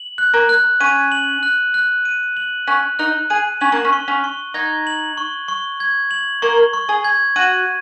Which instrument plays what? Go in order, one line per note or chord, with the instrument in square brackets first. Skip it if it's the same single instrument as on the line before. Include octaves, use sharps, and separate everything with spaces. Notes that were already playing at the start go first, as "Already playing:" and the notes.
Already playing: [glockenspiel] F#7
F#6
[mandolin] A#3
[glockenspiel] F#6
[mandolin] C#4 [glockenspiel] D#7
[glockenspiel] F#7
F#6
F#6
D#7
F#7
[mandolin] C#4 [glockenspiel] F#6
[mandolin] D#4 [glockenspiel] F#6
[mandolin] G#4 [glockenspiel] D#7
[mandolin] C#4 [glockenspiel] F#7
[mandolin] A#3
C#4
[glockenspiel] C#6
[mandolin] C#4
[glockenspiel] C#6
[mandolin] D#4 [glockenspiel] G#6
[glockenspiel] F#7
C#6
C#6
G#6
F#7
[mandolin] A#3 A#4 [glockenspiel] C#6
[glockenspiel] C#6
[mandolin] G#4
[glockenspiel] G#6
[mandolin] F#4 [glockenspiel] D#7